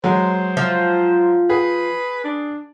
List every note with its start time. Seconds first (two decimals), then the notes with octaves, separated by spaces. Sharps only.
0.04 F#3 G#3 C5
0.57 F3
1.50 G#4 B4
2.24 D4